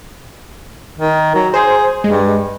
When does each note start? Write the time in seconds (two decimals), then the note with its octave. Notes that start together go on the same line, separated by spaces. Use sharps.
0.98 D#3
1.35 F#3
1.54 G#4 C5
2.04 G2 G#3